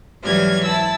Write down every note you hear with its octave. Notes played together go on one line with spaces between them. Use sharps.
G#2 E3 F#3 G3 F6 G#6
E4 A5 E6